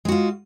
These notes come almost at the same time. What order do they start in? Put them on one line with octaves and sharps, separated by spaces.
G#3 F#4 F4